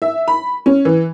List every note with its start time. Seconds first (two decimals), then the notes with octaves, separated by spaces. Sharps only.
0.02 E5
0.28 B5
0.66 C#4
0.85 E3